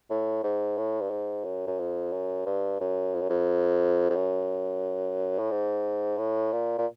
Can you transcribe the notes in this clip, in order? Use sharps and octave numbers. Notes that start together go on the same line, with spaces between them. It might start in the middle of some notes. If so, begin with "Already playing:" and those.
A2
G#2
A2
G2
G#2
F#2
F#2
F2
F#2
G2
F#2
F2
F#2
F2
F2
F#2
A2
G#2
A2
A#2
A#2